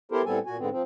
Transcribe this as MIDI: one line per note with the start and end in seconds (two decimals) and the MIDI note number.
0.12 0.22 59
0.12 0.22 64
0.12 0.22 67
0.12 0.22 69
0.12 0.22 70
0.12 0.22 72
0.26 0.39 45
0.26 0.39 55
0.26 0.39 59
0.26 0.39 60
0.26 0.39 69
0.26 0.39 80
0.46 0.57 46
0.46 0.57 66
0.46 0.57 80
0.58 0.69 44
0.58 0.69 50
0.58 0.69 59
0.58 0.69 60
0.71 0.82 53
0.71 0.82 60